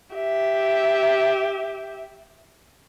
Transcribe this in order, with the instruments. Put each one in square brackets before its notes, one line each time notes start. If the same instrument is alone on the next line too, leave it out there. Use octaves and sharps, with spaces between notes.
[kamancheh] G4 E5